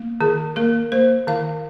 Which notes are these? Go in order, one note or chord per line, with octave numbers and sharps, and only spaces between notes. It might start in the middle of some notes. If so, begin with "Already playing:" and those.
Already playing: A#3
D#3 G#4
A#3 A#4
A#3 C5
D#3 F5